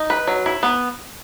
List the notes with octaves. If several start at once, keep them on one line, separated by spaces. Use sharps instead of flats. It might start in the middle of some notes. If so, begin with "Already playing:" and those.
Already playing: D#4
B4
F#3
E4
B3